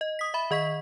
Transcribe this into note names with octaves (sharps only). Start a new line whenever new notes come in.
D#5
D#6 B6
E5 B5
D#3 D#5 C#6 B6